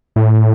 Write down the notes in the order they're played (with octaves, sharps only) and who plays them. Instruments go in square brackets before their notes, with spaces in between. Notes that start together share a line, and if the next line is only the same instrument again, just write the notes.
[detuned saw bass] A2